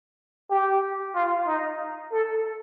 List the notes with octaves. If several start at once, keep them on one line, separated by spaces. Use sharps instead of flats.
G4
F4
D#4
A4